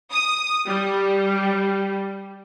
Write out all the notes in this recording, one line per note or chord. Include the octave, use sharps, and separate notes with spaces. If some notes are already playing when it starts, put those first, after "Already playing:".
D#6
G3